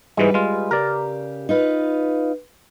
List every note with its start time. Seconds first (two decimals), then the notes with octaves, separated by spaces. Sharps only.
0.17 G#2 E3 G3 G#3 B4
0.34 G#3 F4
0.71 C#3 G4 A#4 D5
1.49 D#4 F4 B4